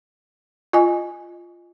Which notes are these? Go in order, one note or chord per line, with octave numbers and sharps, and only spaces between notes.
F4 D#5 G#5